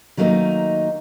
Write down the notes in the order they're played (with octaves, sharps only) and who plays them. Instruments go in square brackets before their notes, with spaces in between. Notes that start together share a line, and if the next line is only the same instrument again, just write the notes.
[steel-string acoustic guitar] D#3 F#3 A3 A#3 C#4 D#4